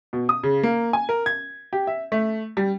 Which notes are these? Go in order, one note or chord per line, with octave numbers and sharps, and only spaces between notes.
B2
D#6
C#3
A#3
G#5
A#4
G#6
G4
E5
A3
G3